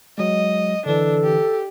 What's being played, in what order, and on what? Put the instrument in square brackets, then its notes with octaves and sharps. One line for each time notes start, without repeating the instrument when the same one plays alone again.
[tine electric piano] F#3 G#3 [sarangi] D#5
[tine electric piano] D3 E3 [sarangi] D4 [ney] A4
[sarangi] G4